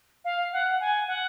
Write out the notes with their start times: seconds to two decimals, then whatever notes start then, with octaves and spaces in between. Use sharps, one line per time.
0.25 F5
0.53 F#5
0.80 G#5
1.07 F#5